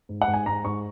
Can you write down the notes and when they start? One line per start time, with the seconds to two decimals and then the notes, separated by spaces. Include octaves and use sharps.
0.09 G#2
0.21 F#5
0.28 G#2
0.33 G#5
0.46 G#2 A#5
0.65 G#2 C#6